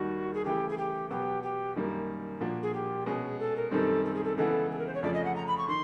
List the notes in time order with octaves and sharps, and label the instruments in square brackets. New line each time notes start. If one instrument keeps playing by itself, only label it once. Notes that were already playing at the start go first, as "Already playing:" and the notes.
Already playing: [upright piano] D#2 D#3 G3 [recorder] F#4
[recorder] G#4
[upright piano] C#3 E3 A3 [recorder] G4
[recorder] G#4
G4
[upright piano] B2 F#3 B3 [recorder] G4
[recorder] G4
[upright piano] F#2 D#3 G3 A#3
A#2 F3 A#3 D4 F#4
[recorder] G#4
G4
[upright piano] B2 G#3 C#4 [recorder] G#4
[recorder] A4
A#4
[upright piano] F#2 D#3 G3 C4 [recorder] A4
[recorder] A4
G#4
A4
[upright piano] C#3 E3 G#3 B3 [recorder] A4
[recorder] A4
A#4
C5
C#5
[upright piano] F2 C#3 F3 A3 C#4 [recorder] D5
[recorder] D#5
F#5
A#5
B5
C#6
[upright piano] D#3 [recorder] C6